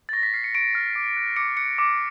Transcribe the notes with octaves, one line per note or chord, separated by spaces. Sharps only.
A6
C#6 A#6
B6
F6 C7
C#7
C#6 D7
F6
D6
F#6
D6 C#7
F#6 C#7
D6